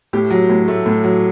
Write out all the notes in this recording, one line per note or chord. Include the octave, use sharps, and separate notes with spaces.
A2 G4
F#3
A2
A3
A2
F#3